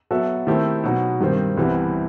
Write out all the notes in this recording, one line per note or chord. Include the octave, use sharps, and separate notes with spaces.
F#3 B3 F#4 A4 E5
D#3 A3 C4 E4 G4
B2 F#3 B3 D#4
G2 D#3 G3 C4
C2 C3 E3 G3 B3